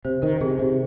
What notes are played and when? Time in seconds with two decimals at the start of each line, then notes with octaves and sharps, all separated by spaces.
0.05 C3 C5
0.22 D#3 A#4
0.41 C3 G#4
0.59 C3